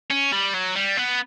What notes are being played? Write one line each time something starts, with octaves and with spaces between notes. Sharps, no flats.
C#4
G3
F#3
G3
B3